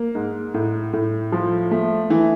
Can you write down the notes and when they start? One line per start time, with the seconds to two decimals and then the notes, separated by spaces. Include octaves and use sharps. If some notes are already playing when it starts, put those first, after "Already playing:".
Already playing: A#3
0.15 G#2
0.54 A2
0.93 A2
1.32 F3
1.71 A3
2.10 E3